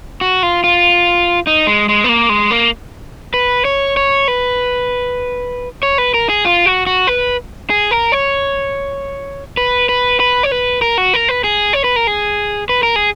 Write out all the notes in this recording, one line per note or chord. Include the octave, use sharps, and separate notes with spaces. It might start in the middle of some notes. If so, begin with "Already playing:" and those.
F#4
F4
F4
D#4
G#3
G#3
B3
A#3
G#3
A#3
B4
C#5
C#5
B4
C#5
B4
A#4
G#4
F4
F#4
F#4
B4
G#4
A#4
C#5
B4
B4
B4
C#5
B4
A#4
F#4
A#4
B4
G#4
C#5
B4
A#4
G#4
B4
A#4
G#4